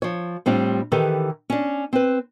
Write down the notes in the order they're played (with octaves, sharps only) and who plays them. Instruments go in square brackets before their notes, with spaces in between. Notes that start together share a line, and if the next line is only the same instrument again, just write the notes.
[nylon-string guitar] F3 C#5
A2 G3 C4 D4 F4
D#3 E3 G4 A4 B4
C#4 D4
C4 B4